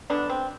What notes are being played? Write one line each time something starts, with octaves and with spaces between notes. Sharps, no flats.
D3 G#3 B3 D4
C4